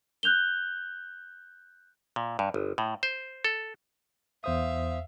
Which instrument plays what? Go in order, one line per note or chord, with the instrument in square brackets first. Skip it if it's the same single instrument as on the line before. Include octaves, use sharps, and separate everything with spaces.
[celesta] F#6 G6 F7 G7
[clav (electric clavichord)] A#2
G2
G1
A2
C5
A4
[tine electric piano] E2 C5 D#6 [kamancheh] E5 F5